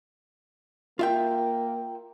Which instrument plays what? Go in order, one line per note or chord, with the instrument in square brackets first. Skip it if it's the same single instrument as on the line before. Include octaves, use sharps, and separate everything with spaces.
[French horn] A#3 [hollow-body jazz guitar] F4 E5 G5